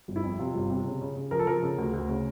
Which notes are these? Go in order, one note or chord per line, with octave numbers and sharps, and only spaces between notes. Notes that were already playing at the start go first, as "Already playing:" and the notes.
G1
E4
F2
C3 F4
G1
C3
C#3
C#3
C#3
F3 A#4
A4
F3 A#4
C#3
D2
D2
C#3